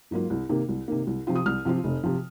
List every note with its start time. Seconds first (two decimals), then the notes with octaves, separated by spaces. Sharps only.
0.11 G#2 F#3 A#3 F4
0.30 C2
0.49 C3 D#3 A#3
0.69 C2
0.88 C3 D#3 A#3
1.07 C2
1.27 C3 F3 C4 F4
1.35 D#6
1.46 C2 F6
1.65 C3 F3 C4 F4
1.84 F1
2.04 C3 F3